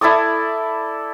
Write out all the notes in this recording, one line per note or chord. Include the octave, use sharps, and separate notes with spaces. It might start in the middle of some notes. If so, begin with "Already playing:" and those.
E4 A4 D5 D#6